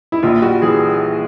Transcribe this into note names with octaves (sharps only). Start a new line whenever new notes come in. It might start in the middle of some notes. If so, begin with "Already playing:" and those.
E4
A#1 F4
G3 F#4
E3 G#4